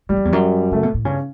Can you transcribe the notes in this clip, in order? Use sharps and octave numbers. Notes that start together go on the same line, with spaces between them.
A2 G3
F#2
E2
F#2
C#3 A3
B2
A2
G2 C#3 C#4